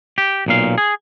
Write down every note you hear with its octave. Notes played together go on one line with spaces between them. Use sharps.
G4
B1 A#2 F5
G#4